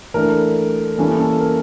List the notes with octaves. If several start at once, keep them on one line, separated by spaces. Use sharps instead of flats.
E3 A3 D4 A#4
E3 G3 A#3 C#4 A4
A4
A#4